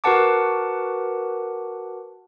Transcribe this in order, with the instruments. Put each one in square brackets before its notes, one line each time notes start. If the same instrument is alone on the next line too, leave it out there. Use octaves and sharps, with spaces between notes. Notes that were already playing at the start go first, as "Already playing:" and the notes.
[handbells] F#4 A#4 B4 F#5 A5 D6